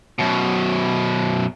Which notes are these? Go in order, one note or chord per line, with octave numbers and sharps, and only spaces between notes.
F#2 B2